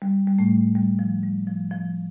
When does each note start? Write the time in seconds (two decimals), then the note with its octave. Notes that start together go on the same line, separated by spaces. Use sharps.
0.02 G3
0.28 G3
0.39 A2 A3
0.75 G3
0.99 F3
1.23 G3
1.47 F3
1.71 F3